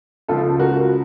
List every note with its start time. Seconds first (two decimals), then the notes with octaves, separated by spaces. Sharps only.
0.28 C#2 C#3 F3 F4 A4
0.59 F#4 A#4